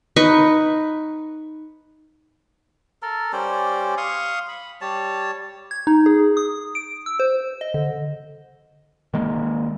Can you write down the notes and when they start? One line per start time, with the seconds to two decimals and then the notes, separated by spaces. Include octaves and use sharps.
0.16 D#4 B4 C#6
3.02 A4 A#4
3.33 G3 C#4 C5 D5
3.98 F5 C6 C#6 D#6
4.48 B5
4.81 G3 C#5 A5
5.71 G#6
5.87 D#4
6.06 G#4
6.37 D#6
6.75 D7
7.06 E6
7.20 C5
7.61 D#5
7.74 D3
9.14 D#3 G#3 A#3